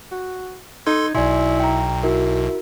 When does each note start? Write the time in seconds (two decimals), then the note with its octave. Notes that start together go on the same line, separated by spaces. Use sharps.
0.12 F#4
0.87 D#4 A4 C6 G#6
1.15 B1 B2 E4 D5 G#5 C6
1.60 G5 A#5
2.03 E4 F#4 A#4